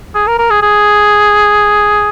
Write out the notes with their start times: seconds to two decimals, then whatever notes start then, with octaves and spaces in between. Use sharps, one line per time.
0.15 G#4
0.27 A#4
0.39 A#4
0.50 G#4
0.62 G#4